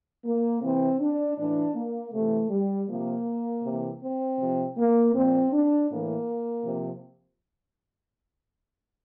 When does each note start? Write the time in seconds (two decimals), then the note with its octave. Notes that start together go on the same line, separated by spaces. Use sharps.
0.25 A#3
0.62 C3 E3 C4
1.00 D4
1.38 A2 E3 D4
1.75 A#3
2.13 C3 E3 A3
2.50 G3
2.88 C3 F3 A#3
3.64 C3 E3
4.02 C4
4.39 C3 F3
4.77 A#3
5.14 A#2 F3 C4
5.53 D4
5.91 A2 E3 A#3
6.65 C3 F3